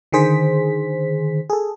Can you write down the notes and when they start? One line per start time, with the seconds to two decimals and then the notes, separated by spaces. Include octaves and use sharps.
0.12 D3 D#3 G#4 C5 B6
1.50 G#4 A4